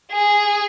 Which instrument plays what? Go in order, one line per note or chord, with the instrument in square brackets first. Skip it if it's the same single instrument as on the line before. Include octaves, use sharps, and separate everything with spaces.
[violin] G#4